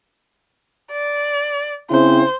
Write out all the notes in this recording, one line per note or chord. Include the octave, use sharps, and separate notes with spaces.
D5
C#3 C4 E4 C5